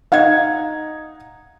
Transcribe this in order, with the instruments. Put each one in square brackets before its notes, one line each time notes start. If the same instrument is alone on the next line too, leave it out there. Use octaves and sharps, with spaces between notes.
[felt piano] D#4 G#6 [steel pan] F5 F#5